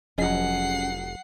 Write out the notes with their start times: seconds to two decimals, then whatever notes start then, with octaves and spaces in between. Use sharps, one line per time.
0.18 F1 F3 F#3 C#4 G#4 D#5 F#5 C7